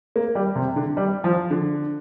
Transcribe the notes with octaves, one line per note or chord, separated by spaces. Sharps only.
A#3
G3
C3
D3
G3
F3
D3